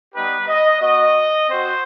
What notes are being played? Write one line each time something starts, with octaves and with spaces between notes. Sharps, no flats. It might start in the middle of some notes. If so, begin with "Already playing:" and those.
G3 B3 D#4 G4 B4
D#5
B3 F#4 D#5
C4 F#4 C5